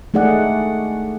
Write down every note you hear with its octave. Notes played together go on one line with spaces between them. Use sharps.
A3 D#4 G#4 D5 F#5